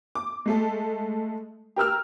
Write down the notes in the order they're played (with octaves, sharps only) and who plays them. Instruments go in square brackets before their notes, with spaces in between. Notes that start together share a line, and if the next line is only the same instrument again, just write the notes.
[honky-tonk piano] D6
G#3 A3 A4
G4 A#4 E6 F6